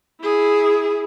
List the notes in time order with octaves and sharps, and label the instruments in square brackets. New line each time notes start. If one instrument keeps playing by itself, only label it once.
[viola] E4 G#4